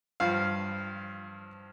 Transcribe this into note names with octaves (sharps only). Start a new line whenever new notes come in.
G2 F3 F5